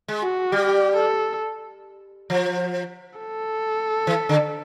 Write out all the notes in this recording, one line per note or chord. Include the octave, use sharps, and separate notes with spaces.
G#3
F#4
G3 G4
A4
F3
A4
E3
D3